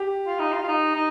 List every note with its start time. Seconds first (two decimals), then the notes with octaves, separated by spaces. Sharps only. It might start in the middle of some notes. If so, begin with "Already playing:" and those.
Already playing: G4
0.26 F4
0.39 D#4
0.52 F4
0.64 F4
0.68 D#4
0.95 D#4